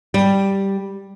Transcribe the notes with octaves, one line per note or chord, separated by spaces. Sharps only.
G3